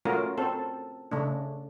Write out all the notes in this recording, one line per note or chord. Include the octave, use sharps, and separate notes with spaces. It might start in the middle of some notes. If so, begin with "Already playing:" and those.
A3 C#4 F4 F#4 A#4
C4 A4
C#3 A3 D4